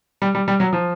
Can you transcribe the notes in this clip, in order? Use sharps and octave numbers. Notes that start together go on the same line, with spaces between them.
G3
G3
G3
F#3
F3